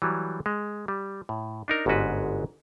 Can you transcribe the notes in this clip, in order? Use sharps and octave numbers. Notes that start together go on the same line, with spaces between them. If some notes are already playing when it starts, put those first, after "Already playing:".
E3 F#3 G3
G#3
G3
A2
D4 D#4 A#4
G1 G#2 G#3 C#4 F#4 B4